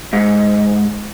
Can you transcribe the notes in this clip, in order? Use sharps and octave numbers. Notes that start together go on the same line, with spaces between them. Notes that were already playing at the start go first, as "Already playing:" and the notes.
G#2